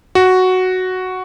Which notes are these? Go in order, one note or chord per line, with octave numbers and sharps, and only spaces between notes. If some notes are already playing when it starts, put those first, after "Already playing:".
F#4